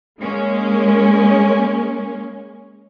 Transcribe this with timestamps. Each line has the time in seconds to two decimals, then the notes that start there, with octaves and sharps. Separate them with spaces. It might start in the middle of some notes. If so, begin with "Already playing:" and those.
0.21 G#3 A#3 C#4